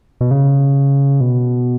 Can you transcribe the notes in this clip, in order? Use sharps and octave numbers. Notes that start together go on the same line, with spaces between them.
B2
C#3
B2